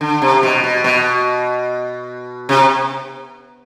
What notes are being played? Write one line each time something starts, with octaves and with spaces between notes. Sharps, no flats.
D3
C3
B2
B2
B2
C3